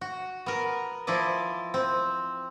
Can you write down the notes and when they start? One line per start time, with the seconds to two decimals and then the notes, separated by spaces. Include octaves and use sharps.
0.01 F#4
0.46 B3 A#4
1.07 F3 E4 D5 D#5
1.74 C4